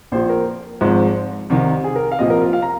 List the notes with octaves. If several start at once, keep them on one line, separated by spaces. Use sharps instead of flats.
A#1 A#2 F3 C5
A#4
G#1 G#2 F3
C2 C3 D#3
G#4
A#4
F5
C2 A#2 F3 D#5
A#4
F4
F5
A#5